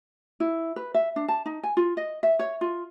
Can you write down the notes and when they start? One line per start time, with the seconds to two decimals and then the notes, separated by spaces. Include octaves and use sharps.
0.40 E4
0.76 B4
0.94 E5
1.16 D4
1.28 A5
1.46 D#4
1.63 G#5
1.77 F4
1.97 D#5
2.23 E5
2.39 C#5
2.61 F4